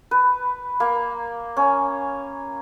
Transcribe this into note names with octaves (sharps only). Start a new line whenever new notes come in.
B4
A#3
C#4